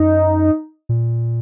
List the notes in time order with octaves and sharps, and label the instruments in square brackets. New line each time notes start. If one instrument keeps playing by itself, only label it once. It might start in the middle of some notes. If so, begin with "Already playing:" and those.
Already playing: [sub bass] F#2 [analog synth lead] D#4
[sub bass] A#2